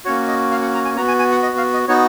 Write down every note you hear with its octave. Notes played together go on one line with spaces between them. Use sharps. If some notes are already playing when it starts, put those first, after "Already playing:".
A#3 C#4 F#4 C#5
D#5
F5
F#5
A#5
G#5
B3 F#4 A#5
G#5
G#5
F#5
D#5
F5
D#5
B3 D#4 F#4 C#5